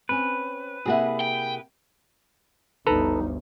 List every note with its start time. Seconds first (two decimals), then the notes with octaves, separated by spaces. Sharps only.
0.09 C4 C#4 B4
0.86 C3 A#3 E4 F#4 G#4 F#5
1.20 G5
2.87 G1 D2 D#4 A4 B4 A#5